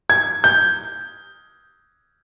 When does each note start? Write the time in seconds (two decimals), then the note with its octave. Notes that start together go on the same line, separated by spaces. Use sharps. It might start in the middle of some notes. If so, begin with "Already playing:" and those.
0.10 G#6
0.44 G6